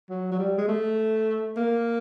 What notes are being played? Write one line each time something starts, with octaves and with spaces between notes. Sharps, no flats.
F#3
F#3
G3
G#3
A3
A#3